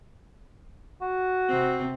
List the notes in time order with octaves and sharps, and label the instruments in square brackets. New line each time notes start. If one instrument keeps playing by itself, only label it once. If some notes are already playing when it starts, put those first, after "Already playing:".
[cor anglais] F#4
[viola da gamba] C3 C4